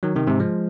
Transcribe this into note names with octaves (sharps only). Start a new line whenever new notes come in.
D#3 F#3
C3 D#3
G#2 C3
F3 G#3